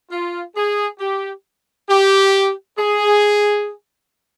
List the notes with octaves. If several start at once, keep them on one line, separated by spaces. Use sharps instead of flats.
F4
G#4
G4
G4
G#4